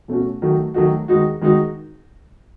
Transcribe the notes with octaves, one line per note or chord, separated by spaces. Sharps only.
B2 A3 C#4 F#4
D#3 F#3 A3 D#4 F#4
D#3 F#3 A3 D#4 F#4
D#3 G#3 D#4 F#4
D#3 G#3 D#4 F#4